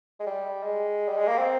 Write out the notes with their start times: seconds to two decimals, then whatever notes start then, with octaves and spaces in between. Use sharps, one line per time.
0.20 G#3
0.27 G3
0.63 G#3
1.08 G3
1.18 G#3
1.28 A#3
1.38 C4